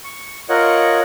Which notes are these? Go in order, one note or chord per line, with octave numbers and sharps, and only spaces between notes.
C#6
F4 A#4 C#5 D#5 F#5